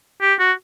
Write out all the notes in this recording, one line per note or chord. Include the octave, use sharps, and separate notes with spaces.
G4
F#4